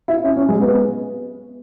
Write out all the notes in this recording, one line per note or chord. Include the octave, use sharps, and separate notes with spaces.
E4
C#4
C#4
G#3
B3